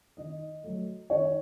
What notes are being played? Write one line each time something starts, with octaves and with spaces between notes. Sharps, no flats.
D#3 D#5
F#3 A3
D#3 C#5